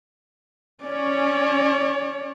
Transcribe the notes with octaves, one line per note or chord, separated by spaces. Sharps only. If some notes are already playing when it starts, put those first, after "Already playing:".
C#4 C#5 D5